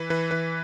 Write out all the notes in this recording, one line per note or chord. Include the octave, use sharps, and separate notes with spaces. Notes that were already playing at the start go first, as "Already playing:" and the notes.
Already playing: E3 B4
E3 B4
E3 B4